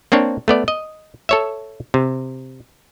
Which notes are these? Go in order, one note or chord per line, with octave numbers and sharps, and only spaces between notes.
A#3 C4 D4 C#5
A3 B3 D5
D#5
A4 C#5 E5
C3